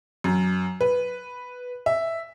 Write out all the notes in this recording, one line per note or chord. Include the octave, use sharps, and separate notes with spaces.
F#2
B4
E5